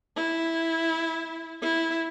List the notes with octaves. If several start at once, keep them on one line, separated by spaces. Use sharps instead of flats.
E4
E4